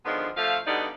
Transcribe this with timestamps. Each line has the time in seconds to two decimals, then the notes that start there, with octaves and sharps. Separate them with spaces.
0.06 D3 D#3 F3 G#3 B3 D4
0.37 F3 A3 F5
0.67 B2 D3 G3 B3 D#4 D5